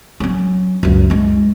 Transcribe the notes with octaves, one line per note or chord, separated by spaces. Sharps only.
F#3 C#4
C#2 F#2
G#3 E4